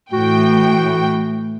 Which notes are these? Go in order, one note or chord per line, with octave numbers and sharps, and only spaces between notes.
A2 E3 F#4 G5